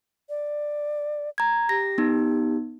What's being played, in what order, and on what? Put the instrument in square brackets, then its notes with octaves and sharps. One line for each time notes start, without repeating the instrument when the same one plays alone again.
[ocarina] D5
[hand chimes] A#5 G#6
[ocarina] G4 [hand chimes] A#6
[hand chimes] B3 D#4